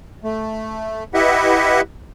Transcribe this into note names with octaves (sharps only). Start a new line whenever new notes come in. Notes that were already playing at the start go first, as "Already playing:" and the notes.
A3
E4 G4 B4 D#5 E5 F#5